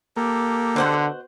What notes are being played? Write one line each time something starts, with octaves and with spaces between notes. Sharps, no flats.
A#3 G4 A4
B2 D3 C5 F#5